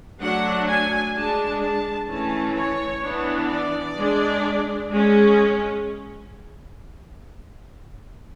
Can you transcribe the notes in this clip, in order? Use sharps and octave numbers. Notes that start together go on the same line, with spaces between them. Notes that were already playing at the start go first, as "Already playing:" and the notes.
F#3 A3 D4 F#5
G#5
G#3 D4 A5
A5
E3 A3 C#4 A5
C#5
E3 B3 D4
D5
G#3 D4
G#3 C#4